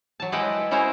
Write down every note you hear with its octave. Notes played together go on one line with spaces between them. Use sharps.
F#3 A5
G#3 E4 B4 D#5 F#5 G5
C#4 E4 F#4 G#4 A#4 C5